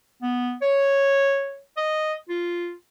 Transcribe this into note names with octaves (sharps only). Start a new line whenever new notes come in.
B3
C#5
D#5
F4